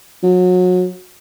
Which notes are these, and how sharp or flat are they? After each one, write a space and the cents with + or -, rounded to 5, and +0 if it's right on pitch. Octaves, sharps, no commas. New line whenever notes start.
F#3 -30